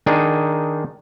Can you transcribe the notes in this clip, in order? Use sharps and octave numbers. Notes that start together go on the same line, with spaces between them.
D#3 D4 D#4 G#4